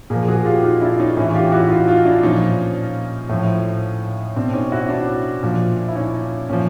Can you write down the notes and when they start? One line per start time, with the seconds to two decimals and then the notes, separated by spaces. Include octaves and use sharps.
0.10 A#2 F3 G#4 A#4
0.28 F#4 G#4
0.45 F4 G4
0.63 D#4 F4
0.82 D4 E4
0.99 C#4 D#4
1.16 A2 E3 C#4 D#4
1.34 F4 G4
1.52 E4 F#4
1.70 D#4 F4
1.87 D#4 F4
2.05 D4 E4
2.23 A#2 F3 C#4 D#4
3.29 A2 F3
4.36 B2 C4 D4
4.53 C#4 D#4
4.72 E4 F#4
4.89 D4 E4
5.43 A#2 F3
5.88 E4
5.96 C#4 D#4
6.49 A#2 F3 C#4